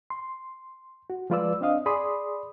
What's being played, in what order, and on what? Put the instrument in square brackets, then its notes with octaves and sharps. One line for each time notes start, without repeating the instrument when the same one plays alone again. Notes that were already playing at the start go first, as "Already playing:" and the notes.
[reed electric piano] C6
F#4
F3 G#3 F4 B4 D5 E6
C4 D4 D#5 F5 D#6
G#4 D5 B5 C6 D#6